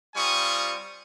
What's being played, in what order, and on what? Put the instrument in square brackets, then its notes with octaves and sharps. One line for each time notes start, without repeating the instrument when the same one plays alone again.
[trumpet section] G3 C4 F4 G#5 C#6 D#6